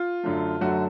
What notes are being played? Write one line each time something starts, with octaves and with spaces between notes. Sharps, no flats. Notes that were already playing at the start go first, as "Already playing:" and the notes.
Already playing: F4
F#2 D3 F#3 A3
F#2 D3 F#3 A3 F#4